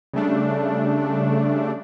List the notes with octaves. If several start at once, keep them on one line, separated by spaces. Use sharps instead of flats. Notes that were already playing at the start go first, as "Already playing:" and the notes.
C#3 G3 A3 D4